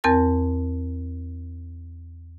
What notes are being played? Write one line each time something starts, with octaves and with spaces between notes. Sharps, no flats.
E2 C4 A#4 A5 A6